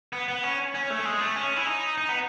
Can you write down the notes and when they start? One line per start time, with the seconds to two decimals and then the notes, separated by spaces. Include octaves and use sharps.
0.13 B3
0.28 B3
0.44 C#4
0.75 C#4
0.90 A3
1.05 G#3
1.21 A3
1.36 C#4
1.56 E4
1.67 D#4
1.98 D#4
2.09 B3